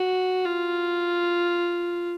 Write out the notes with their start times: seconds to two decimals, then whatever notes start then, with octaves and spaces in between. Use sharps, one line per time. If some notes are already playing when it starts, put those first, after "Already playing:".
Already playing: F#4
0.44 F4